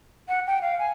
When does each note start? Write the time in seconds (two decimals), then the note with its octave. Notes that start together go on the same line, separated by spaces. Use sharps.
0.28 F#5
0.47 G5
0.62 F5
0.79 G#5